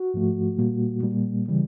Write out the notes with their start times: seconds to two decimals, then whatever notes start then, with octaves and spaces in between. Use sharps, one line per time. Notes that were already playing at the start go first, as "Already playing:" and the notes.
Already playing: F#4
0.14 G#2 F3 A3
0.58 A#2 G3 A#3
1.03 A#2 G3 A#3
1.48 C#3 E3 G3